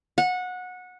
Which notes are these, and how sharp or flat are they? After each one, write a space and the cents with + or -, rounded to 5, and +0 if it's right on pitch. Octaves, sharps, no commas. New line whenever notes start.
F#5 -20